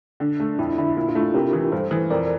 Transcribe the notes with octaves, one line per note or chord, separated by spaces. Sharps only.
D3 D4
A3
F2 E4
D3 E4
A#2 E4
D4 F4
A3
C3 G4 A#4
E3
G2 A4 C5
E3
F2 A#4 D5